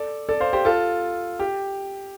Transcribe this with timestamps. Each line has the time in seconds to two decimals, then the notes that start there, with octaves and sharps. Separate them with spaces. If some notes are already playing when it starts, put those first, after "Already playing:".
Already playing: A4 D5
0.29 A4 D5
0.40 C5 F5
0.53 G4 C5
0.65 F4 A4
1.39 G4